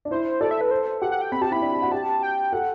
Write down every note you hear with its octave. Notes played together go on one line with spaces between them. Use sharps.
D4
E4 C5
A4 D5
E5
B4
C5
G4 F#5
F#5
G5
C4 B5
G4 A5
E4 B5
D4
G4
F#4
G4 A5
G5
A4 F#5